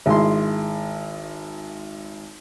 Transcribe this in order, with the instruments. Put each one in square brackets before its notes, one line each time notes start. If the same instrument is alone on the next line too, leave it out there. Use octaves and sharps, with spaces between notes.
[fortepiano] G#1 G#3 E4 C6